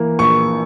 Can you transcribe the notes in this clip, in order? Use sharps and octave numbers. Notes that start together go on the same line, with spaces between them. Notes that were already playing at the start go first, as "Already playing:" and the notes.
Already playing: E3 A#3
A#1 C#6